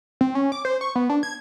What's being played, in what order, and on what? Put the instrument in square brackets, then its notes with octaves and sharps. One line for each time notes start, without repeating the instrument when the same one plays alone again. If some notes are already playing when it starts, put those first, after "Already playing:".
[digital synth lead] C4
C#4
D6
C5
C#6
B3
D4
G#6